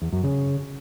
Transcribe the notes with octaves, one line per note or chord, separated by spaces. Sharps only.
E2
F#2
C#3